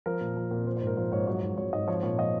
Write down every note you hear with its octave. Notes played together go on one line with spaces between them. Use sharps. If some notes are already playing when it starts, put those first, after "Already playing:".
F3 A#4
A#2
F3
A#2
F3 C5
C5
G#2
A#4
F3 C5
G#2 C#5
F#3 C#5
G#2
F#3 C#5
G#2 D#5
F3 C#5
A#2 C#5
F3 D#5